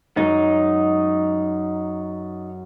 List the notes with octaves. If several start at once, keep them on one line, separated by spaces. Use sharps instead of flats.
F#2 G#3 D#4